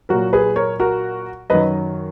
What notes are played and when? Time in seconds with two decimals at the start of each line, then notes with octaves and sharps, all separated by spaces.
0.09 A#2 F#3 F#4 A#4
0.33 G#4 B4
0.56 A#4 C#5
0.80 F#4 A#4
1.50 F#2 D#3 F#3 B4 D#5